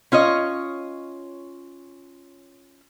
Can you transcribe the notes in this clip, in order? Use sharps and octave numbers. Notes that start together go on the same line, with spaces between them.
C#4 F4 C#5 D#5